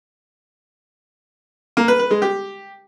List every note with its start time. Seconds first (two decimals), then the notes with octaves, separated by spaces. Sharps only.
1.77 A#3
1.88 B4
1.99 B4
2.11 G#3
2.22 G4